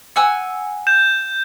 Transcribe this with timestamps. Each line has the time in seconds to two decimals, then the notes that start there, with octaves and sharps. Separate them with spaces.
0.16 F#5 G#5 E6
0.87 G6 E7